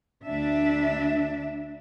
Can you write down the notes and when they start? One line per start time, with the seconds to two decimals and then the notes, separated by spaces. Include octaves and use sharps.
0.24 D2 D4 E5